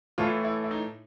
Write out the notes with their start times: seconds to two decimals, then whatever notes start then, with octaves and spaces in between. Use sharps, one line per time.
0.18 A2 E3 A3 F4
0.44 E4
0.64 E4
0.71 D#4